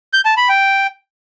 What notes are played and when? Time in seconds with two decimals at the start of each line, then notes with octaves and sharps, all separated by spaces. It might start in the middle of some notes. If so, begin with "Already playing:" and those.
0.13 G6
0.25 A5
0.37 B5
0.49 G5